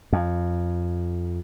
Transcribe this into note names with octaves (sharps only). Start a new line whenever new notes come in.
F2